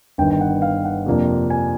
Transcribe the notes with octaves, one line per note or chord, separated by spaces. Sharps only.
G1 G2 D#3 G5
G5
F#5
F5
F#5
F2 C3 F3 A#3 D4
G#5